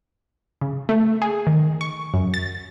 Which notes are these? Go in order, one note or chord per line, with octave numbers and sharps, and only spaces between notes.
C#3
A3
G#4
D#3
C#6
F#2
A6